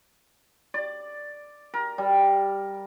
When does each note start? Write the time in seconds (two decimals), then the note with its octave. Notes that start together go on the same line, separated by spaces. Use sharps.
0.74 D5
1.74 A#4
1.98 G3